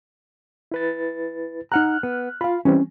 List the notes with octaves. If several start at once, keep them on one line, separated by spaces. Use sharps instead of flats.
E4 B4 A6
D#4 F#5 A#5 F6 F#6
B3
F4 F5 B5
E3 G3 C4 C#4